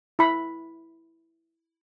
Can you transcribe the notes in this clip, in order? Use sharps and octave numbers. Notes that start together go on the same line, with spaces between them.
E4 B5